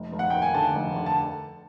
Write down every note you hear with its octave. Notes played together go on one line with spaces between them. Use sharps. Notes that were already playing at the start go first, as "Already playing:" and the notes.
Already playing: F1
F1
F#5
D#2 G5
G#5
D3 A5
F1
D3
A5